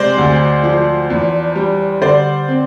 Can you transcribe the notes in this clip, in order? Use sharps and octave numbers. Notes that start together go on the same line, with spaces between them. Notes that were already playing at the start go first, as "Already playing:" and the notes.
Already playing: C3 G#3 C5 D5
D2
F3
E2
G3
D3 C5 D5
C4